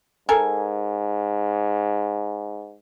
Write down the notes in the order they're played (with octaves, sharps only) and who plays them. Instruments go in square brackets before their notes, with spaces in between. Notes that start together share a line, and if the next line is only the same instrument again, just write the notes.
[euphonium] G#2 [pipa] A4 A#4 G#5